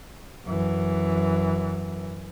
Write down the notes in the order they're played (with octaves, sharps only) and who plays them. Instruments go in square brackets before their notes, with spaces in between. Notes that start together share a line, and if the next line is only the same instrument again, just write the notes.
[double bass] F#2 E3